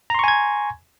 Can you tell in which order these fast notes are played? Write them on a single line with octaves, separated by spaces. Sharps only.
A#5 C6 C#6 G#5 G#6